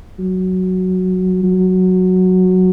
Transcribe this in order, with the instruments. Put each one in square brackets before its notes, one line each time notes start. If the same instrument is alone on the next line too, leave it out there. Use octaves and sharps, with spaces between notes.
[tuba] F#3
F#3